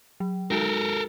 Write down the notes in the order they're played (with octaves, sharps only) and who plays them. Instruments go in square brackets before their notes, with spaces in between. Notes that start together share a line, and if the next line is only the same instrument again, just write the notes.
[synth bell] F#3
[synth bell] G#3 D#4 F#4 [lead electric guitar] A4 A#4